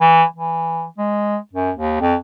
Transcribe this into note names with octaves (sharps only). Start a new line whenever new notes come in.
E3
E3
G#3
F#2
D#2
F2